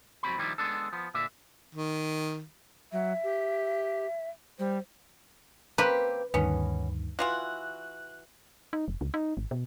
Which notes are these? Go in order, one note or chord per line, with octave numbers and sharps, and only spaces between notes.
F2 F#3 C4 B5
D#3 F3 G3 E4
G#3 B3 D4 A4
F3 B3
A#2 D3 D4 E5
D#3
F#3 E5
G4
G3 C5
A#3 C4 G4 B4
D2 G2 D#3 B3 C#4
E3 F4 F#4 F#6
D#4
F1
C#2
D#4
G#1
B2